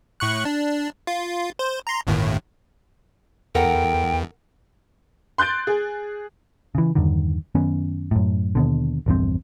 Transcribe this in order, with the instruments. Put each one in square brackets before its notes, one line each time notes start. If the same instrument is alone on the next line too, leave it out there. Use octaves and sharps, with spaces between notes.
[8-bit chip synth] A2 C#6 F#6
D4
F4
C5
A#5 C6
G1 D#2 A2
[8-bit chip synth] E2 [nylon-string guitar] A4 A#4 F#5 [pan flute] G5
[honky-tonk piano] C6 F#6 G6 A6 D7
G#4
[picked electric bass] C#3 E3
E2 G2 D3 D#3
F#2 D#3 B3 C#4
F#2 A2
D#2 B2 D3
A#1 E2 G2 C4